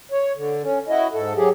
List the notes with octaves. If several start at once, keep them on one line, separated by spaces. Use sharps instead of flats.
C#5
D3
C#4
E4 F#4 D#5
G#2 A4
F#3 G4 G#4